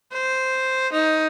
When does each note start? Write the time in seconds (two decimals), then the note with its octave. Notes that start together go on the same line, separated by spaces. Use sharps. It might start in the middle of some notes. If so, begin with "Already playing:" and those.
0.13 C5
0.93 D#4